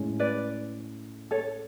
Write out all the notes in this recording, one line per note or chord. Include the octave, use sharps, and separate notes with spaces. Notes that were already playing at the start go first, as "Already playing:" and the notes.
Already playing: A2 G#3 C#4
B4 D5
A4 C#5